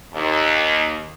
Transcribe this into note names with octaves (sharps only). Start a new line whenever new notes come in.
D#2